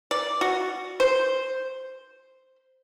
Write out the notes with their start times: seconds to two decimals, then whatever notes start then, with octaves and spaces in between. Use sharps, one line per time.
0.11 D5
0.41 F#4
1.00 C5